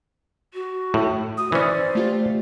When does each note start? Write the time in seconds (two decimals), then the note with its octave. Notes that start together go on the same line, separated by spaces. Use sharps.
0.54 F#4
0.94 A2
1.37 F#4 D#6
1.52 E3 C#4 C5 D5
1.95 A3 F4 G4